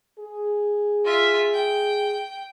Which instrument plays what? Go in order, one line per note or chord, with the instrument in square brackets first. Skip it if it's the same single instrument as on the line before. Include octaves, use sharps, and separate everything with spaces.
[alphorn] G#4
[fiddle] F4 E5
G5